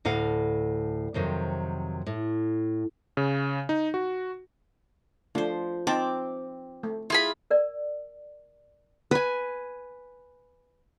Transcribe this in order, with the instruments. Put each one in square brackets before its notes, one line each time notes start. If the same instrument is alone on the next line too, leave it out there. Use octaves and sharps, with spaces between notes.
[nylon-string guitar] D2 A2 F5 F#5 G#5
F2 C3 D#3 F#3
A2
[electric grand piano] C#3
D#4
F#4
[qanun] F3 C5 [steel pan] A3 D4
[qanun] C4 [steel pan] D#4 C5 A5 [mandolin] D6
[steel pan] A3
[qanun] E4 [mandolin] F4 G#4 B5
[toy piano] A#4 D5
[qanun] B4 G#5